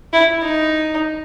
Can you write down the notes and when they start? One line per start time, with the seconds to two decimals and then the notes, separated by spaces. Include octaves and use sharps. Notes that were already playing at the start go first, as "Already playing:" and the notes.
0.13 E4
0.43 D#4